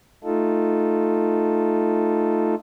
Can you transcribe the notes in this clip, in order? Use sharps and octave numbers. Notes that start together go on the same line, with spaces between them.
A3 D#4 F4 A4